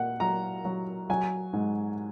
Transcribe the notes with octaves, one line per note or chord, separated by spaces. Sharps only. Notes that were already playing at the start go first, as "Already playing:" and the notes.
Already playing: A#2 F#5
F#3 A#5
F#3
F#3 G#5
G#2